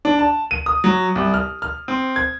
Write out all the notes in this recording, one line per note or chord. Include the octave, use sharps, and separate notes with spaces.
D4
A5
D#7
D#6
F#3
C2
F6
F6
C4
G#6